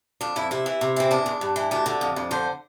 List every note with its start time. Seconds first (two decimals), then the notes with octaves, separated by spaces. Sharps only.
0.21 F2 D4
0.36 F2 E4
0.51 C3 E4
0.66 E3
0.81 C3
0.96 E3 C4
1.11 E2 D4
1.26 E2
1.41 G2
1.56 E3
1.71 D2 D4
1.86 D3
2.01 F2
2.16 F2
2.31 D3 C5